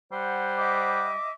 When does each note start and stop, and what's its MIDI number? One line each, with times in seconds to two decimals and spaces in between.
0.12 1.14 55
0.12 1.06 72
0.12 1.06 78
0.57 1.31 75
0.57 1.31 76
0.57 1.31 86